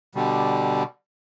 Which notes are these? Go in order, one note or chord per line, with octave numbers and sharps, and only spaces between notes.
B2 D3 G3